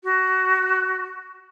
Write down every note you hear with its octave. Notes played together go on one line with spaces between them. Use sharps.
F#4